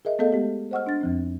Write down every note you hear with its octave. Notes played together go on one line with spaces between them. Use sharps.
G#4 A#4 D#5 E5
A3 B3 G#4 A4 D#5 F5
G#3 B3 G4
C5 D#5 F#5 C#6 E6 F6
D4 A6
F2 F3 C4